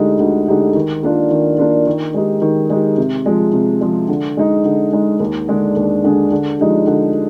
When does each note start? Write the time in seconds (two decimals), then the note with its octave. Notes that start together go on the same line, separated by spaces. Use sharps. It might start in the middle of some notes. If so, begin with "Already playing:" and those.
Already playing: D2 D3 G#3 D#4 G4
0.20 D2
0.47 D3 G#3 D#4 G4
0.75 D#3
1.03 A#3 D4 F4
1.31 D#3
1.58 A#3 D4 F4
1.86 D#3
2.14 G#3 D#4 G4
2.42 D#3
2.70 G#3 D#4 G4
2.98 C3
3.26 F3 G#3
3.54 C3
3.81 F3 G#3
4.08 D3
4.37 G#3 D#4
4.65 D3
4.93 G#3 D#4
5.20 D#2
5.48 D3 G#3 D4 G#4
5.76 D#2
6.04 D3 G#3 D4 G#4
6.32 D3
6.60 F3 G#3 D#4 G4
6.87 D3